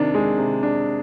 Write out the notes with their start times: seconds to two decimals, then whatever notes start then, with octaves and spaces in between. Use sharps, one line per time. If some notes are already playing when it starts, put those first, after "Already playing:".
Already playing: C3 D#3 D4
0.14 G#3
0.38 C3
0.63 D4